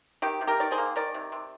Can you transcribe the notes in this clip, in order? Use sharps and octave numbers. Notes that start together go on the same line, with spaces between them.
D#3 G4
C3
G4 A#4
D#3 D5
G#4 C5
A#3
D#3 A#4 D5
C3
C3